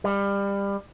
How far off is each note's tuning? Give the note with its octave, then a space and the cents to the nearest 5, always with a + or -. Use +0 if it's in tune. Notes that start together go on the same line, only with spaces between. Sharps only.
G3 +25